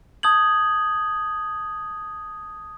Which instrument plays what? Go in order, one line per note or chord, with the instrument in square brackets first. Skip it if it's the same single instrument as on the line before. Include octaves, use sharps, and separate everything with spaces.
[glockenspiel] A5 D#6 G6 G#6 F#7